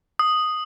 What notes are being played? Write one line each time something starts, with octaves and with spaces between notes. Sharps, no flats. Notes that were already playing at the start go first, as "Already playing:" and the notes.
D#6